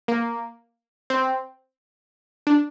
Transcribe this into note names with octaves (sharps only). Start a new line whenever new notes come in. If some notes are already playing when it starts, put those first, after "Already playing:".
A#3
C4
D4